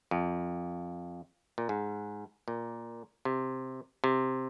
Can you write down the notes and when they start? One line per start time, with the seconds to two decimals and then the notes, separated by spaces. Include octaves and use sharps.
0.11 F2
1.58 A#2
1.69 G#2
2.48 A#2
3.25 C3
4.04 C3